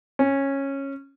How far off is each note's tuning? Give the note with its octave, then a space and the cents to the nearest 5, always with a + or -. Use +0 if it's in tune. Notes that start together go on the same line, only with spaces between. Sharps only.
C#4 -15